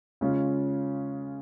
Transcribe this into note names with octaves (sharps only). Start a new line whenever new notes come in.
C#3 G#3 C#4 F4